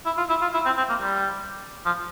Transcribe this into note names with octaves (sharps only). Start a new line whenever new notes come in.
E4
F4
E4
F4
E4
C4
C4
A#3
G3
F3